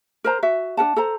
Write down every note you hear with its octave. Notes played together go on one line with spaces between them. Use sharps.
A#4 C5 A#5
F#4 E5
D4 A#4 F#5 A5
A4 C5 A#5